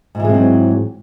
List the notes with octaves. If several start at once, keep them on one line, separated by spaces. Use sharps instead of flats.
G#2 E3 F#3 G#3 C4